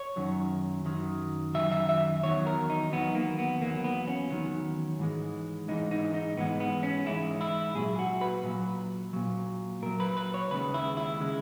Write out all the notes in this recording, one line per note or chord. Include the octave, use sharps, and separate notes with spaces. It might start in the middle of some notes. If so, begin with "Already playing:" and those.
Already playing: C#5
F#2 D#3 F#3
F#2 D#3 F#3
F#2 D#3 F#3 E5
E5
E5
E2 D#3 F#3 C#5
A#4
D#4
E2 D#3 F#3 B3
A#3
B3
E2 D#3 F#3 A#3
B3
C#4
E2 D#3 F#3
G#2 E3 G#3
G#2 E3 G#3 D#4
D#4
D#4
G#2 E3 G#3 B3
B3
C#4
G#2 E3 G#3 E4
E4
A#2 F#3 G#4
F#4
B4
A#2 F#3
A#2 F#3
A#2 F#3 A#4
B4
B4
C#5
D#2 C#3 G#3 B4
E4
E4
C#3 G#3